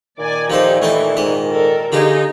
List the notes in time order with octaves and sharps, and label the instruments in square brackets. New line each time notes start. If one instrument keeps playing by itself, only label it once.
[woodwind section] A#2 D#3 [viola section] D5 G#5
[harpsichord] F3 A4 C5 [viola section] D#4 G4
[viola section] E3 [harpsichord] A3 D#5 G5
[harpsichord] G#2 D#5
[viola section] A4 A#4
[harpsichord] D3 F4 G4 [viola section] D#4 G#4 D#5